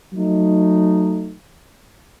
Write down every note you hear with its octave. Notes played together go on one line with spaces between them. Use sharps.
F#3 A3 D#4